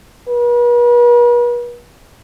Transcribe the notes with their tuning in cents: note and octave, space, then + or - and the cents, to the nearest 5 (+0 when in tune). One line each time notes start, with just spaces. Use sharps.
B4 -45